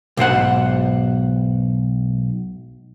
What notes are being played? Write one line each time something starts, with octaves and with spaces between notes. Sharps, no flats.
B1 G#2 C5 F#5